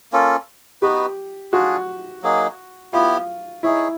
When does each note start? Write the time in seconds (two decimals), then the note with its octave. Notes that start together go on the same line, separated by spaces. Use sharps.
0.12 A#3 C#4 F4 A4
0.82 B3 D#4 F#4 G4 B4
1.52 D4 F4 F#4 G#4
2.22 F#3 A#3 D#4 G#4
2.93 B3 E4 F4 G4
3.63 D#4 E4 G#4 C#5